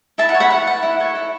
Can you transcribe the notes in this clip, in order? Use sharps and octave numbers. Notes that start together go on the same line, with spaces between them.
E4 E5 A5
F#5
C#5
F#5 B5
E4 F#5
B4 F#5
E4
A4 C#5
E4